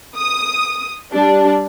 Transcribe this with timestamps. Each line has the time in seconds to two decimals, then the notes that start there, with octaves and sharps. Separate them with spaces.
0.17 D#6
1.12 G3 D4